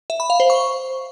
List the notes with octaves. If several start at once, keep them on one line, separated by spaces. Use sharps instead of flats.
E5
B5
F5
C5
C#6